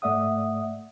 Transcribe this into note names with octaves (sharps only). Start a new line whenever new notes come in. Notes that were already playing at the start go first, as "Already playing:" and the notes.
G#2 A3 D5 E5 F#5 D#6